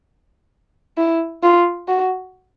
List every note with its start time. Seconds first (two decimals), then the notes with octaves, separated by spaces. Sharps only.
0.98 E4
1.43 F4
1.88 F#4